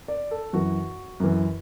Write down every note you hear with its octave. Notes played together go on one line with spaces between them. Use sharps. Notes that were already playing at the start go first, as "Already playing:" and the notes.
D5
A4
F#2 E3 F#4
F#2 E3